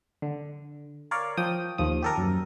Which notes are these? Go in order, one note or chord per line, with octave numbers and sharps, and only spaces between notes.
D3
A#4 C#5 D5 F5
F3 G5 D#6
D#2 F3 D#6
G4 A4 A#4
F#2